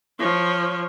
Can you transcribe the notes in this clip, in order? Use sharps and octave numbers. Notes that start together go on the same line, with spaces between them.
F3 C#5